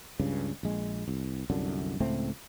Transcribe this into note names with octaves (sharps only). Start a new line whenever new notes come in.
C#2 G2 C#3
A#1 G#3
C2
C2 F#2 D3
C#2 A2 A3 C4